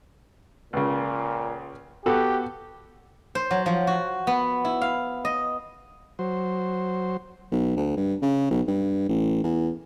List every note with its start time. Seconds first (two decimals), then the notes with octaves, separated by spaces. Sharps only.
0.73 C#2 A#2 C#3
2.06 B3 F#4 G4 A4
3.35 C5
3.51 F#3
3.66 F3
3.87 F#4
4.27 B3
4.65 E4
4.81 F5
5.25 D#5
6.19 F#3 C5
7.51 B1
7.76 D2
7.97 G2
8.22 C#3
8.50 B1
8.67 G2
9.09 A1
9.44 E2